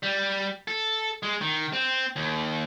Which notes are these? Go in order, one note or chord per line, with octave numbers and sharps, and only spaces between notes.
G3
A4
G#3
D#3
C4
D#2